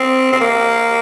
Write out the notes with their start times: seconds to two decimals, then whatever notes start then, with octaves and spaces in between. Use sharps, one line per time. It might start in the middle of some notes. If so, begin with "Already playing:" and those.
Already playing: C4
0.32 C4
0.40 A#3